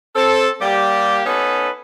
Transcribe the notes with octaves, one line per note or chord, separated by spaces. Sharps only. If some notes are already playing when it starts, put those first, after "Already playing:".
C4 A4
G3 A#3 G4
B3 C#4 D#4 A4 B4